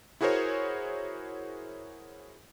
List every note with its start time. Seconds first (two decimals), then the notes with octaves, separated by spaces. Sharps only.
0.21 E4 F#4 G#4 A#4 C5 C#5